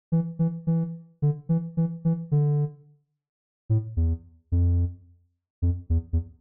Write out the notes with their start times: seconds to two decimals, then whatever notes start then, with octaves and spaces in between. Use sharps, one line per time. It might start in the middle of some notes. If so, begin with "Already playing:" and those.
0.12 E3
0.39 E3
0.67 E3
1.22 D3
1.49 E3
1.77 E3
2.05 E3
2.31 D3
3.70 A2
3.97 E2
4.52 F2
5.62 F2
5.90 E2
6.13 E2